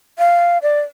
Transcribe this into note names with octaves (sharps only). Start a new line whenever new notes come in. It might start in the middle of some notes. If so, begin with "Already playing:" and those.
F5
D5